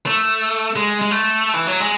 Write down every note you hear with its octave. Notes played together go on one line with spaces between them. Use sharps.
A3
G#3
G#3
A3
E3
F#3
G#3